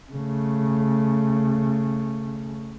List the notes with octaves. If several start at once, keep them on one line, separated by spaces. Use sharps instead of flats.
C#3 A3